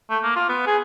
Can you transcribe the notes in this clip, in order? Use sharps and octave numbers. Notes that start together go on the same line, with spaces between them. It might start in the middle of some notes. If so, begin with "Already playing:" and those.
A3
A#3
F4
B3
G#4